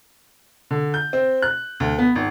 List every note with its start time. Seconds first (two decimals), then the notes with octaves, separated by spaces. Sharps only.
0.71 D3
0.94 G6
1.13 C4
1.43 F#6
1.80 D2
1.99 B3
2.15 G#1